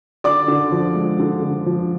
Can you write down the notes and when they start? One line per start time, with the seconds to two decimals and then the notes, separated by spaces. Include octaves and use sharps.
0.24 D3 D5 D6
0.48 D3
0.72 F3
0.95 G#3
1.19 D3
1.42 D3
1.66 F3